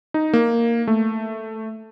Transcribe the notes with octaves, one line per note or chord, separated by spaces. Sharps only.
D#4
A#3
A3